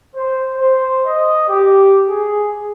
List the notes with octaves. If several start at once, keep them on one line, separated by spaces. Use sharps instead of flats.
C5
C5
D#5
G4
G#4